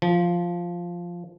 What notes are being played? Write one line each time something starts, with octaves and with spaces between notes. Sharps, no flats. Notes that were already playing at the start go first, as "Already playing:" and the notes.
F3